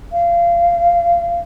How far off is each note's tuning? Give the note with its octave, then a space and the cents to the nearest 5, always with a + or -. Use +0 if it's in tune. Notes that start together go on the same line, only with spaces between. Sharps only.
F5 -25